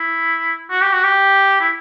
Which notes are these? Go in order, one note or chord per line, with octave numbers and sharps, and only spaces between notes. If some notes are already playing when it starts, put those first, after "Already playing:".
Already playing: E4
F#4
G4
F#4
G4
E4